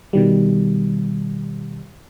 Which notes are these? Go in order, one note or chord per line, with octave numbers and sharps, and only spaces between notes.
B2 D#3 G3